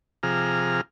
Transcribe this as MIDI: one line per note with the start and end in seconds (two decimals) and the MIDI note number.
0.23 0.81 48
0.23 0.81 53
0.23 0.81 68
0.23 0.81 82
0.23 0.81 89